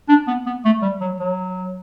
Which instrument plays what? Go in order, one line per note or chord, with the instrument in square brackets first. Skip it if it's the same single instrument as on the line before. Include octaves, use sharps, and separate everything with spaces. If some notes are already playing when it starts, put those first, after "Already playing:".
[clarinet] D4
B3
B3
A3
G3
F#3
F#3